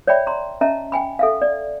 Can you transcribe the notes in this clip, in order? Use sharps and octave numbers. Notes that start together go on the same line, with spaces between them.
C#5 D5 E5 G5 B5
A#5 C6
C#4 D#5 E5 A5 A#5
G5 G#5 B5
A4 E5 F5
D5